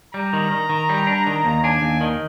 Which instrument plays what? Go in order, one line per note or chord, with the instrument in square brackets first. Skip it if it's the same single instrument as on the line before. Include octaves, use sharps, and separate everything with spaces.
[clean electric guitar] G3 [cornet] A#5
[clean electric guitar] D#3
D#3
D#3
G3
D4
D#3
D#2
[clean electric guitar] D4 [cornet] G#5
[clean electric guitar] D#2
D#3